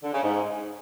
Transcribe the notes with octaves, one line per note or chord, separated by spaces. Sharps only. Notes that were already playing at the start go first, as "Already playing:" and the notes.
D3
C#3
G#2